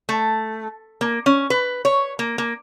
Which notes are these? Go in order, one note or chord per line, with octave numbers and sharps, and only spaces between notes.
A3
A#3
C#4
B4
C#5
A#3
A#3